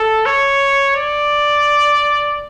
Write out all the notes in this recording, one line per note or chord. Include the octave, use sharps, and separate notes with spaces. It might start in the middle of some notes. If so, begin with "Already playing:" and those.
Already playing: A4
C#5
D5